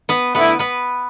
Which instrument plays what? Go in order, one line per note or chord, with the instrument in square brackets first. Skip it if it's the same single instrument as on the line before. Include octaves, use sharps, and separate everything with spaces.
[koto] B3 B4
[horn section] D3 A3 E4 [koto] B3 B4
[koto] B3 B4